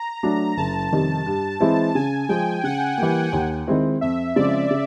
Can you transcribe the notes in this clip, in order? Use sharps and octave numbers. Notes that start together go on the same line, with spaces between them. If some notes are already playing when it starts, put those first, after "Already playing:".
Already playing: A#5
F#3 A3 D4
F#1 A5
F2 C3 D#3 G3
G2
E3 G#3 C4 E4
C#3 G#5
F3 G#3 G5
C#3 F#5
E3 G3 A#3
D#2
D#3 G#3 C4 E4
F2 E5
C#3 F3 G#3 C4 D5
C#3